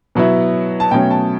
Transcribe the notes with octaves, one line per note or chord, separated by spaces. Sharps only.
B2 F#3 B3 E4
A5
B2 F#3 A3 C#4 G5
A5